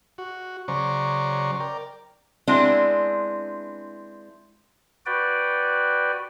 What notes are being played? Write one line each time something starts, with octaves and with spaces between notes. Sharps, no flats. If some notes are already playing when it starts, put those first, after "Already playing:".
F#4
C#3 F#3 C5 D5 A#5 C#6
A#4 D5 G5
G#3 B3 C4 D4 E4
F#4 B4 D5 G5